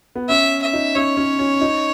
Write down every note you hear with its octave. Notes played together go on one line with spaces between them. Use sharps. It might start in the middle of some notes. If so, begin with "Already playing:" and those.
B3
C#4 E5
E5
D#4
C#4 C#5
C#4
C#4
D#4